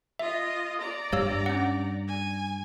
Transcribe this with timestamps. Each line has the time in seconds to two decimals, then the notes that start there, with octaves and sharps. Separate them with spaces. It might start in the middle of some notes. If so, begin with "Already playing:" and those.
0.19 F4 D#5 E5
0.81 D5 A#5
1.13 G2 G3 C#5 F5 E6
1.46 C#4 F#5
2.08 G#5